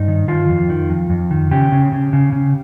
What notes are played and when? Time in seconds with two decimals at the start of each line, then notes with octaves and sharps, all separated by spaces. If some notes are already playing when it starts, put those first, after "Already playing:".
Already playing: G2 D#4
0.08 D#3
0.28 D#3 F4
0.49 F2
0.70 D#3
0.89 F2
1.10 F2
1.31 D#3
1.51 C#3 G4
1.72 C#3
1.92 C#3
2.13 C#3
2.33 C#3